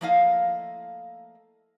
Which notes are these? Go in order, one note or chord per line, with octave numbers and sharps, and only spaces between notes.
F3 A3 A#3 E4 D#5 F5